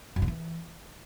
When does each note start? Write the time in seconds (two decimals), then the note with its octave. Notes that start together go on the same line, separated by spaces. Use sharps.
0.16 F#2
0.22 D3
0.28 E3